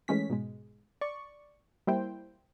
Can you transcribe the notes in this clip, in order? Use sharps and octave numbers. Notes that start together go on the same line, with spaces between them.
E3 G#3 A3 C#4 B6
G#2 B2 G#3
D5 C#6
G3 A#3 E4 C5 G5